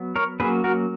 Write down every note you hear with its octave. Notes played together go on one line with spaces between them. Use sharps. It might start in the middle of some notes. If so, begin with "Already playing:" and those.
Already playing: F#3 B3
A#4 C#5
F#3 A#3 C#4 G#4 B4
F#4 A#4